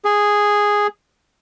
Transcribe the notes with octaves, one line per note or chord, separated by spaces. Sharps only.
G#4